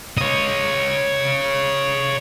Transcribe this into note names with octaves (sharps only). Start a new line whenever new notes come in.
C#5 D#5